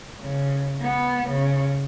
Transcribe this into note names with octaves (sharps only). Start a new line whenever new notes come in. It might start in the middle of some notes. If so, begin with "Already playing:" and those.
C#3
B3
C#3